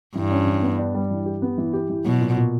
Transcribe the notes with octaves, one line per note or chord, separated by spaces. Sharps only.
G2 E3
C#4
E3
B3
D4
G3
E3
G4
B3
E3
G4
E3
B2 F#3
A#2
A#2